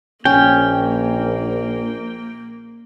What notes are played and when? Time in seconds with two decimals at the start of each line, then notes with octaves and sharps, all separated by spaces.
0.25 A#1 A#3 C#4 G5